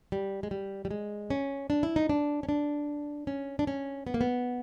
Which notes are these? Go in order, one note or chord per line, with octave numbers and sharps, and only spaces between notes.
G3
G#3
G3
G3
G#3
C#4
D4
E4
D#4
D4
C#4
D4
C#4
D4
C#4
B3
A#3
B3